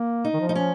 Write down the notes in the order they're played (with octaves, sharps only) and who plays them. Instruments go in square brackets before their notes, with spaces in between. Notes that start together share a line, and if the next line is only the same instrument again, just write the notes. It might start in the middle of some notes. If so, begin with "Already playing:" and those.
Already playing: [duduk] A#3
[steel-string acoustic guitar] D#4
[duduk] D#3
F3
[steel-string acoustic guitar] D#4
C#4